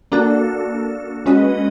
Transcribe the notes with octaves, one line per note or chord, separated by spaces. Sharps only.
A#3 D4 F#4 A4
G#3 C#4 F#4 B4 D#5